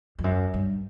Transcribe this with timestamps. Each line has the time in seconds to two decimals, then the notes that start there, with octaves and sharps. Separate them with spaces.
0.19 F2
0.24 F#2
0.54 G2